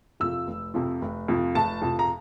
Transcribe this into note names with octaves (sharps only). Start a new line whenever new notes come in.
F2 C3 F3 E6
F1
F2 C3 F3
F1
F2 C3 F3
F1 A5
F2 C3 F3
A#5